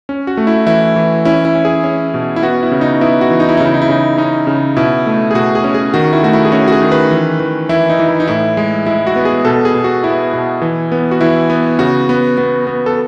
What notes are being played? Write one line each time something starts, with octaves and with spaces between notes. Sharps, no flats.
C#4
F#4
A3
E4
E3 E4
E3
C#4 E4
E4
C#4
G#4
C#4
B2
E4
B3 F#4
E4
C#3
D#4
B3 E4
F#4
E3
D#4
E4
C#3 D#4
E4
D#4
E4
C#3 D#4
C#4 D#4
C#3
B2 E4
A3
G#4
B2 F#4
G#4
C#4
G#4
D#3 F#4
E4
A3 F#4
E4
G#4
C#4 F#4
F#4
G#4
D#3
B4
E3
E3
E3 E4
D#4
E3
E4
D#4
A2 E4
G#3
G#3 E4
F#4
B3
G#4
B2 A4
G#4
B2
F#4
B3 E4
B2
E3
B3
F#4
E3 E4
B3
C#3 F#4
B3
B3
B3
A4